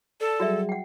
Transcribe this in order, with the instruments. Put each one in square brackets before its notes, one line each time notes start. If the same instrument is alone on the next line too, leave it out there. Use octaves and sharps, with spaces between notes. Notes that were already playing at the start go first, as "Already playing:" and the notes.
[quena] A4 [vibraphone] D5 A5
[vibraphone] F#3 G3 G#4 [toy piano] F#4 D5 E5
[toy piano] F#5 G5